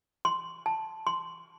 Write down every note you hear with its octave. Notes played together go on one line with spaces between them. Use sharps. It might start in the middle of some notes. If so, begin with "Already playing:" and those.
C6
A5
C6